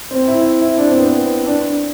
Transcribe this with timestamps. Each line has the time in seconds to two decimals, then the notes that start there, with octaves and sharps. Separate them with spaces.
0.11 C4
0.27 E4
0.61 E4
0.78 D4
0.87 C4
0.97 B3
1.06 C4
1.46 D4